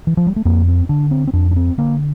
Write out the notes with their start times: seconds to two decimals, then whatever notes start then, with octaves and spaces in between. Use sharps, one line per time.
0.07 E3
0.17 F3
0.27 G3
0.36 A3
0.45 F2 A#3
0.68 C4
0.89 D3 D4
1.11 C4
1.27 C4
1.33 F2 D4
1.51 D4
1.56 C4
1.78 D3 A#3